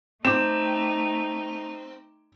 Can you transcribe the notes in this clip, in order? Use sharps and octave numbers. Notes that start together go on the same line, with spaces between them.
A3 C4 D#4 D6 E7